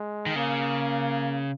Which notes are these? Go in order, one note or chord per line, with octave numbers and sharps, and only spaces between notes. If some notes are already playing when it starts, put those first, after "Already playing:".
Already playing: G#3
D#3
C#3 A#3